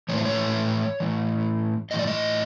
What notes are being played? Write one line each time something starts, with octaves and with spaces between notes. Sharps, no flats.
A2 E3 C#5
C5
C#5
A2 E3
A2 E3 D#5
D5
D#5